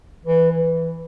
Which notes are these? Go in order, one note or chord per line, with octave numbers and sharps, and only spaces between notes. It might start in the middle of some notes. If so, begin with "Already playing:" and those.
E3
E3